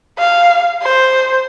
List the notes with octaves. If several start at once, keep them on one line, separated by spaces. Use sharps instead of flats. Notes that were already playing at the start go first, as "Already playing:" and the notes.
F5
C5